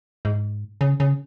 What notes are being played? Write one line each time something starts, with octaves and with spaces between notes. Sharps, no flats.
G#2
C#3
C#3